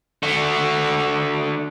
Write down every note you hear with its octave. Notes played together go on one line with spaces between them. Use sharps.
D3 F#4